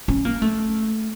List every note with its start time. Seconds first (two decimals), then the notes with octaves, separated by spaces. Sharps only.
0.08 C#4
0.25 A#3
0.42 A3